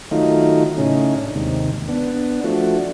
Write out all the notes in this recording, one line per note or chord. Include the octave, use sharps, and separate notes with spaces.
D#3 F#3 A3 D#4 F4
A2 C#3 C#4 D#4
D4
D#2 G#2 C3
B3 D4
F3 A3 D4 F#4